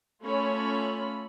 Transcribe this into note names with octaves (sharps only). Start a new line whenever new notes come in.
A3 C#4 F4 A4 C#5 B5